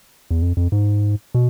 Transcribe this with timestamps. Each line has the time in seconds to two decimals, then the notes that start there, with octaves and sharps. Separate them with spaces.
0.31 E2
0.42 F2
0.57 F2
0.72 G#2
1.35 B2